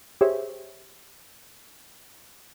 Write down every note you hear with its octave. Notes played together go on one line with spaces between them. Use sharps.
G4 G#4 C5 C#5 E5